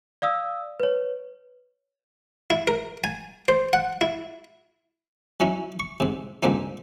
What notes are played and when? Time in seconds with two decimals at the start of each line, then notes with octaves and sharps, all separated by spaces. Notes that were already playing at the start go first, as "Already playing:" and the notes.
0.22 D5 F5 D#6 E6
0.80 B4 C#5
2.50 E4
2.67 A#4
3.04 G#5
3.48 C5
3.73 F#5
4.01 E4
5.40 F#3 C#4 D#4 E4
5.80 C#6
6.00 G#2 C3
6.43 C#2 G2 A#3 C4 D#4